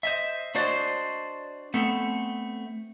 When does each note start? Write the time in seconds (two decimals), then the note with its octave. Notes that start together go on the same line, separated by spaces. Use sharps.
0.03 C5 D#5 E5
0.55 D4 F#4 C5 D5 D#5
1.74 A3 B3 C4 A4